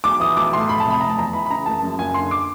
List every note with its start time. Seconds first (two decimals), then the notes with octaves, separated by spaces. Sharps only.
0.04 B1 D6
0.20 E3 D#6
0.36 B1 D6
0.53 A2 C6
0.69 F1 B5
0.80 C3 A5
0.90 B5
1.01 F1 A#5
1.10 A5
1.18 E2 A#5
1.33 E3 B5
1.46 B5
1.50 C#3 A#5
1.66 F#1 A5
1.82 F#2
1.99 F#1 G#5
2.14 D3 C6
2.31 D6